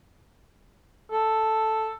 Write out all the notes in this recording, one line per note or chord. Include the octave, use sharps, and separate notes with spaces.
A4